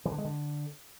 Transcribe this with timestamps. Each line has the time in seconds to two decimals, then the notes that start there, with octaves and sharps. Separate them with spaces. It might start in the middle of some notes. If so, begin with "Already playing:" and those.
0.05 E3
0.12 D3
0.18 G#3
0.25 D3